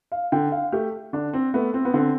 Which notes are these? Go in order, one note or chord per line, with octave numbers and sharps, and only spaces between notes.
F5
D3 G5
F5
A3 G4
D3 D4
C4
A3 B3
C4
B3
D3 C4